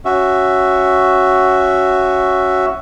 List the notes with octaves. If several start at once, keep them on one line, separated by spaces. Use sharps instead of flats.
C#4 F#4 E5